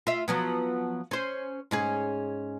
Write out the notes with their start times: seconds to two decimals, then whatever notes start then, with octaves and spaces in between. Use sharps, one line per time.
0.07 F4 E5
0.28 F3 F#3 B3
1.11 C#4 C5
1.71 G#2 C#4 G#4